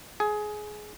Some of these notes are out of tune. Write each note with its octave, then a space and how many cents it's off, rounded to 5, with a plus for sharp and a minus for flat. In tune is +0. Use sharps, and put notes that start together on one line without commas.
G#4 +20